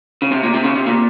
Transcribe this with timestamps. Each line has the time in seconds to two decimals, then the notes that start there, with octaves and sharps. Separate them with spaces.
0.22 C#3
0.32 C3
0.43 A#2
0.54 C3
0.64 C#3
0.76 C3
0.87 A#2